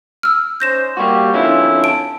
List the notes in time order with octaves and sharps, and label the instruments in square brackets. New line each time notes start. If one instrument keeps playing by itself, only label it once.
[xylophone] E6 F6
[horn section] C#4 D#4 C5 [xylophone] G6 A#6 E7
[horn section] G3 [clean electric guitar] A#3 F#4
[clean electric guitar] F2 D3 C#4 [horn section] E4 F4
[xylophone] A5 D7